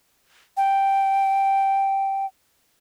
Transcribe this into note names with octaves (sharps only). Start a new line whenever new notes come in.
G5